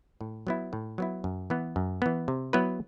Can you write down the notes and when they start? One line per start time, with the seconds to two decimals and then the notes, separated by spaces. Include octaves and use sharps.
0.21 A2
0.47 F#3 B3 E4
0.73 A2
0.98 F#3 B3 E4
1.24 F#2
1.50 E3 B3
1.76 F#2
2.02 E3 B3
2.28 C3
2.53 F#3 B3 E4 B4